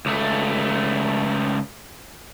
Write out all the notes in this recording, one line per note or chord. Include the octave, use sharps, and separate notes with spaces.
C#2 A3